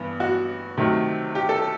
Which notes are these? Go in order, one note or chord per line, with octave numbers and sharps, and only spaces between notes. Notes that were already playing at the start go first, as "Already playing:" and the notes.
Already playing: G2 E3 B3
F#4
C3 D#3 F#3 A3
G4
A4